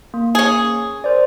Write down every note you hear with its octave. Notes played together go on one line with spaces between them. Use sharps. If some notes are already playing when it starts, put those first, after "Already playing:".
A#3
C#4 G#4
A#4 C5 D5